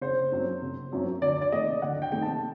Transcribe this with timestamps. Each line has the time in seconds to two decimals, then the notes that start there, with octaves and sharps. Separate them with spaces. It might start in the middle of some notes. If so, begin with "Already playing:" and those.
0.01 F#1 C5
0.32 F#2 F#3 C4
0.62 F#1
0.92 F#2 F#3 C4
1.22 D2 D5
1.42 D5
1.52 C3 D#3 A3 D#5
1.82 D2 F#5
2.02 G5
2.12 C3 D#3 A3 G5
2.22 A5